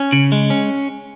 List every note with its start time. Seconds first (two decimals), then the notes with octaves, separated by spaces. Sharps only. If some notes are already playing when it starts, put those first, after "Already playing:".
Already playing: C#4
0.13 C#3
0.32 G#3
0.50 C#4